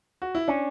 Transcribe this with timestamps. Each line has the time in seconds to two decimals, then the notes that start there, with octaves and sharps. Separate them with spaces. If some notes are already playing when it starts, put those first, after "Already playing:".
0.22 F#4
0.35 E4
0.48 C#4 D4